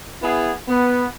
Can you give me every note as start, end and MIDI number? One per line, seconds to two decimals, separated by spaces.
0.22 0.51 59
0.22 0.51 64
0.22 0.51 68
0.68 1.06 59